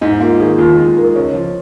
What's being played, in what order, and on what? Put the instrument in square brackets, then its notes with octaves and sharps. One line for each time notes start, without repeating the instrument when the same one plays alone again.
[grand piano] G#2 [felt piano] D#4
[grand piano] A#3 [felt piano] F4
[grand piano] D#3 [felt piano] G#4
[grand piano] D#2 [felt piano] F4
[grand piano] G#3
[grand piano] D#3 [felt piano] A#4
[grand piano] C#2 [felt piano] C#5
[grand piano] F3